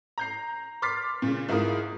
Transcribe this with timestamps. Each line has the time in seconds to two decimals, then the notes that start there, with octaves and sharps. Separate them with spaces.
0.18 A#5 G6 C7
0.82 C6 D6 F6 A6 B6 C7
1.22 A#2 C#3
1.48 G#2 E4 F4 A#4 D#6